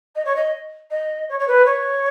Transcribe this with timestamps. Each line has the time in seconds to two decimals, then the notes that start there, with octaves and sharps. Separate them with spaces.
0.15 D#5
0.25 C#5
0.36 D#5
0.90 D#5
1.29 C#5
1.39 C#5
1.47 B4
1.65 C#5